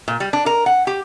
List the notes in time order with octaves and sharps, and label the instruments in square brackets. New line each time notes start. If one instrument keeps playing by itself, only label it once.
[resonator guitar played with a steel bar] A#2
G3
D4
A#4
F#5
G4